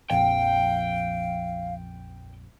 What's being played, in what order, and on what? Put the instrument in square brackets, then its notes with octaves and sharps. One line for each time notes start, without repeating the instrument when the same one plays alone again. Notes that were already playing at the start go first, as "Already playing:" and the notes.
[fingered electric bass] A#1 F2 [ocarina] F5 [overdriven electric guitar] G5